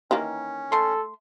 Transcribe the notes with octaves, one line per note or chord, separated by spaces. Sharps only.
D#3 E3 A#3 C#4
A3 A4 C6